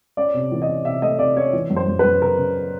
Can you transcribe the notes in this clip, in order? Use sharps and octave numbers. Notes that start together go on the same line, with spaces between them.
C#4 D5
C3
E3
D#5
C#4
C3 E5
A3 D#5
C3 D5
C#4 C#5
E3
F#2
C5
F#2
F#2 B4
C#3 A#4
C#3